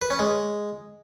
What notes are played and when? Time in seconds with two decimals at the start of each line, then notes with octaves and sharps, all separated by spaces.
0.02 B4
0.10 C#4
0.19 G#3